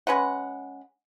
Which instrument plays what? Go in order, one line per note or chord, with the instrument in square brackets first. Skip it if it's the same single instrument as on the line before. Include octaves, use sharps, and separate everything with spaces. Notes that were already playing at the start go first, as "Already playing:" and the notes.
[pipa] G#3 C#4 B4 F#5